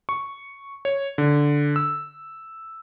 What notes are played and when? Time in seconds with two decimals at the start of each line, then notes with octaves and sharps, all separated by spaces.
0.09 C#6
0.85 C#5
1.18 D3
1.76 E6